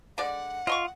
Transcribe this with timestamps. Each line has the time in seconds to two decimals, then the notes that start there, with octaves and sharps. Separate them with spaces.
0.18 D3 G#3 D5 F#5
0.67 F4 D#5 C6 C#6